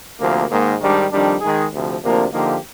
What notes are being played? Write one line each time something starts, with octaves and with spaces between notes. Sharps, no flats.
D2 C3 F3 A#3
G#2 D#3 A#3
G#2 D#3 G3 D4
F2 D#3 G3 D4
D#3 G#3 D#4 G#4
D2 C3 F3
D2 C3 F3 A#3 D4
D3 F3 A#3 D#4 G4